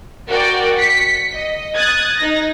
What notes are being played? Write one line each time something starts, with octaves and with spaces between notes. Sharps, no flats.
F#4 A#4 D5 G5
B6 C#7
D#5
D#6 F#6 G#6 A6
D#4 A#6